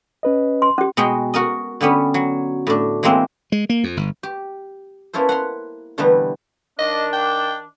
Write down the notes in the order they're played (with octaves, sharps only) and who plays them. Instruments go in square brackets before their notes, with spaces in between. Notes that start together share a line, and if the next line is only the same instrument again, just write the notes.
[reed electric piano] C#4 B4 D#5
[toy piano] C6
C#4 G4
[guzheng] B2 G#3 G#4 F#5 G5
F#4 A#4 D#5
D3 G3 B3 C#4
F#3
A2 D4
E3 G#3 A#3 C4
[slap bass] G#3
A#3
F2
G1
[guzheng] G4
A#3 B3 C#4 E4 A4 C5
F#5 A#5 C6
B2 D3 E3 G3 A3 B3
[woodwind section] D#3 D4 [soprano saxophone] D#5
[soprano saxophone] G5